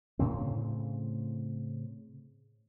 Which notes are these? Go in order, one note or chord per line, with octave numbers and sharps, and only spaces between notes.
A2 C#3 C4